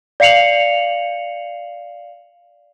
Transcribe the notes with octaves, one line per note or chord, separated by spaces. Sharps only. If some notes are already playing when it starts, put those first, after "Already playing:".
D5 F5 C7 C#7 F7 F#7